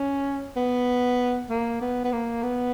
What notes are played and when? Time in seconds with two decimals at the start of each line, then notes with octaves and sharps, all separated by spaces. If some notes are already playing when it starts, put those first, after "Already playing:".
Already playing: C#4
0.57 B3
1.50 A#3
1.81 B3
2.05 B3
2.12 A#3
2.43 B3